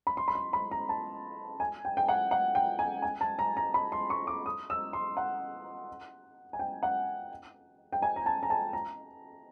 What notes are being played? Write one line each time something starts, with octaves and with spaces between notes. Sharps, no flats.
B5
C6
B5
C6
B5
A#5
A5
G#5
G5
G5
F#5
F#5
G5
G#5
G#5
A5
A#5
A#5
B5
C6
C#6
D6
D#6
E6
C6
F#5
G#5
G5
F#5
G5
G#5
A#5
A5
A#5
A5
A#5